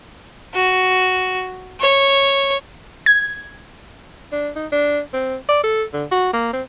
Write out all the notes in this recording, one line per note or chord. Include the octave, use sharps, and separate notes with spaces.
F#4
C#5
G#6
D4
D#4
D4
C4
D5
A4
D3
F#4
A#3
C4